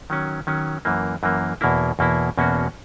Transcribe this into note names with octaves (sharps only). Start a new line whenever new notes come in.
D#3 F#3 C#4
D#3 F#3 C#4
F#2 E3 A#3
F#2 E3 A#3
E2 B2 A#3 E4
E2 B2 A#3 E4
E2 B2 A#3 C#4 F#4